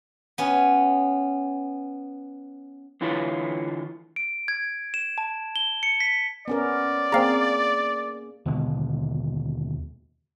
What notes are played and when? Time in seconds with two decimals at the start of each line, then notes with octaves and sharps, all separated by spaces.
0.38 B3 C#4
3.01 D3 E3 E4 F4 B4 C#5
4.16 D7
4.48 G#6
4.94 E7
5.18 A5
5.56 G7
5.83 C#7
6.00 B6
6.48 B3 C#4 A#4 D5
7.12 A#3 C4 G#4 F5 A#5
8.46 D#2 B2 D3 G#3